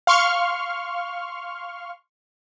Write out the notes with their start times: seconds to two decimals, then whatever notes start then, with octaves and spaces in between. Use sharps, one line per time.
0.07 F5 C6 C#6 F6